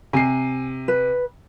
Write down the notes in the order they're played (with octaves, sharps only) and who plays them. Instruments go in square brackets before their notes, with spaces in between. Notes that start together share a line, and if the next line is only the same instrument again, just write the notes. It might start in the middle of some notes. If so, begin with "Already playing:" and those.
[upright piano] C3 C7 [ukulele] G#5
[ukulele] B4